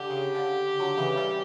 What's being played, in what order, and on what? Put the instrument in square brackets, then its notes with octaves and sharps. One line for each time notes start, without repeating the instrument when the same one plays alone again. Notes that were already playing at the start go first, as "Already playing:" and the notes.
Already playing: [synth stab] D3 [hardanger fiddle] G4
[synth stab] C#3
D3
D3 F#3
C#3 E3
E3 G3